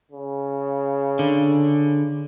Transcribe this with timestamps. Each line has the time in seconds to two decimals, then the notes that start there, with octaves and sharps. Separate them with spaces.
0.12 C#3
1.19 D3